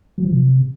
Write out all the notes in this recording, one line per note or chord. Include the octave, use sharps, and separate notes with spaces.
F#3
F3
C3